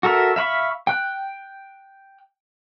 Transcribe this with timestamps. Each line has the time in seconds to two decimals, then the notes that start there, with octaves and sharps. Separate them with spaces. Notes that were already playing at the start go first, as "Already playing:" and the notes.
0.03 F#4 A4 A#4 E5
0.36 E5 F5 B5 C#6
0.87 G5 F#6